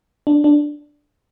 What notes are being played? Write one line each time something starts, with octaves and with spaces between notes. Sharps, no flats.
D4
D4